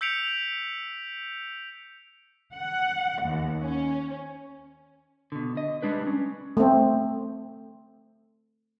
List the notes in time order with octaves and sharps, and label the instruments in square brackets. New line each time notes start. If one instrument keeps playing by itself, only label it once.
[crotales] E6 G6 B6 C#7 D7 F7
[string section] F#5
D#2
C#4
[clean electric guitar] B2 D3
D#5
G3 G#3 D4 B4
C#4
[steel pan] A3 C4